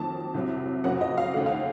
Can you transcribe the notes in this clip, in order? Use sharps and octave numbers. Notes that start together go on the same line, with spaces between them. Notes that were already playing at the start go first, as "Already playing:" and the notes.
Already playing: F2 D#3 F#3 A#3 A5
C2 C3 F#3
F#1 F2 C#3 F#3 A#3 F#5
D#5
F5
D#2 C#3 A3 F#5
F5